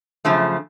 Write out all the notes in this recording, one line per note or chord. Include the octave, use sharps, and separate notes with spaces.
F#2 C#3 F3 A3